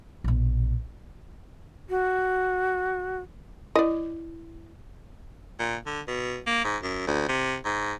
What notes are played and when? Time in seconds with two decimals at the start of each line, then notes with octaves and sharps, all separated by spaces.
0.24 A#1 B2
1.90 F#4
3.76 E4 D5 D#5
5.59 A#2
5.86 D3
6.08 B2
6.47 A#3
6.64 G#2
6.83 F#2
7.07 D2
7.29 C3
7.65 G#2